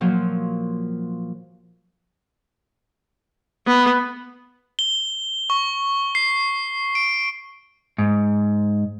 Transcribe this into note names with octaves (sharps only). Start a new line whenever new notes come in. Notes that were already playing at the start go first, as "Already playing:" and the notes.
A#2 F3 F#3 F4 F#4
B3
G7
C#6
C7
D7
G#2